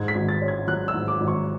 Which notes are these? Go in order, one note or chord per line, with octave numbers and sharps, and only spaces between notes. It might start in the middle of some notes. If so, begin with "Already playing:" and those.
Already playing: G#2 G#6
B6
G#1
A6
C#4
G#6
F#3 F#6
E6
G#2
D6
G#1
C#6